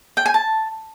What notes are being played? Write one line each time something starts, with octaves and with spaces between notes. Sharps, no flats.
G5
G#5
A5